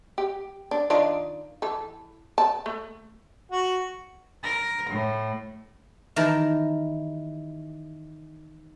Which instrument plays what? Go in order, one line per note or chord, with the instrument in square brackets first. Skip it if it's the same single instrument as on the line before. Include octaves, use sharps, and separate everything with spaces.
[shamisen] G4
D4
D#3 D4 F4
E3 A4
A5
A3
[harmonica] F#4
[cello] A#4
A2
[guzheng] D#3 E3 G4 A#4 A5